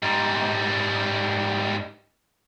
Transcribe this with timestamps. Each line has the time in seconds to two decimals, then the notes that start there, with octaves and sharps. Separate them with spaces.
0.03 G#2 G3